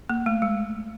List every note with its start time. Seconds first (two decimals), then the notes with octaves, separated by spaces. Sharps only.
0.09 A#3
0.26 A3
0.42 G#3